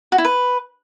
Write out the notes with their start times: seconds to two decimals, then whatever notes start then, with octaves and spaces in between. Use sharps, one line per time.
0.12 F#4
0.18 E4
0.25 B4